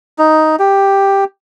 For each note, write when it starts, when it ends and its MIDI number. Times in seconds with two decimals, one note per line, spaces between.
0.19 0.56 63
0.59 1.24 67